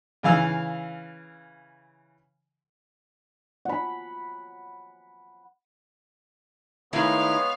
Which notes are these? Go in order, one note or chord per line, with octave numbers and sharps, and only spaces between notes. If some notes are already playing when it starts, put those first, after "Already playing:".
C#3 E3 F5 E6
F#5 B5
D#3 G#3 A3 B3 E4 C#5 F5